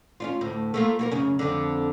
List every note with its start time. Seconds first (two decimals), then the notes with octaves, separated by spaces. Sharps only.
0.20 C#4 D4 F4
0.41 D2 A2
0.74 A3 A#3 F4
0.99 A#3 F4 A#4
1.11 F#2 C#3 C#4
1.39 F2 D3